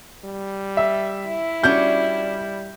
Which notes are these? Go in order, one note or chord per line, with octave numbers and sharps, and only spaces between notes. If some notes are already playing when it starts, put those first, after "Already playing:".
G3
E5
E4
G3 C#4 D4 F#4 G6